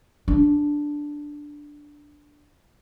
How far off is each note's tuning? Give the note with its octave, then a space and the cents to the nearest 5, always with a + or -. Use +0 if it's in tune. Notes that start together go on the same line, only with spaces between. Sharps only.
D4 +0